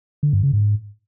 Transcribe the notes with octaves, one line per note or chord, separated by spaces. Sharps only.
D3
G2
C#3
G#2